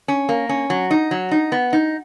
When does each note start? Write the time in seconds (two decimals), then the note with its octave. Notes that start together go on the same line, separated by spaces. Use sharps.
0.08 C#4
0.29 A#3
0.49 C#4
0.70 F#3
0.91 D#4
1.11 F#3
1.31 D#4
1.52 B3
1.73 D#4